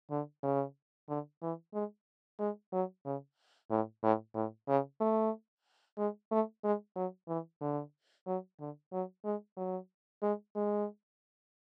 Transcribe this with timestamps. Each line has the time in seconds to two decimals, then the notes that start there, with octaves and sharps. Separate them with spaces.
0.11 D3
0.43 C#3
1.09 D3
1.42 E3
1.74 G#3
2.39 G#3
2.73 F#3
3.05 C#3
3.70 A2
4.03 A2
4.35 A2
4.68 C#3
5.01 A3
5.98 G#3
6.31 A3
6.64 G#3
6.96 F#3
7.28 E3
7.61 D3
8.27 F#3
8.60 D3
8.92 F#3
9.25 G#3
9.57 F#3
10.22 G#3
10.56 G#3